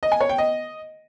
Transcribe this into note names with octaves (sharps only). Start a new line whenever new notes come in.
D#5
G#5
C#5
G5
D#5